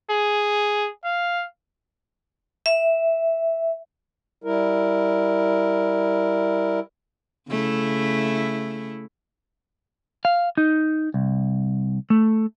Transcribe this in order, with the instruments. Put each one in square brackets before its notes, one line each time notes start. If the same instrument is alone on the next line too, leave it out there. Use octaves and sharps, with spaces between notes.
[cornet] G#4
F5
[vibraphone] E5
[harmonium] G3 E4 A#4
[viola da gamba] C#3 A3 E4
[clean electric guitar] F5
D#4
C2
A3